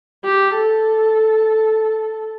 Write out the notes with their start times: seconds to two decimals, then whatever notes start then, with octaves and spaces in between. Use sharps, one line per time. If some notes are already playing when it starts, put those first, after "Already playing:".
0.25 G4
0.57 A4